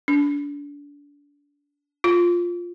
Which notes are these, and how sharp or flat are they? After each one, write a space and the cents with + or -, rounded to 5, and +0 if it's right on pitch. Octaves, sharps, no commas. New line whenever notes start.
D4 -30
F4 +5